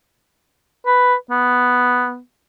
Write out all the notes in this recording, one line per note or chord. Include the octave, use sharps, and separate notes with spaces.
B4
B3